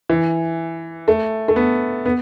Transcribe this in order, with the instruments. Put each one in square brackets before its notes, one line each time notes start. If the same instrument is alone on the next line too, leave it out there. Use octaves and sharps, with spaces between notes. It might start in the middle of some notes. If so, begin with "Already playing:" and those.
[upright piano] E3
A3
A3
B3
B3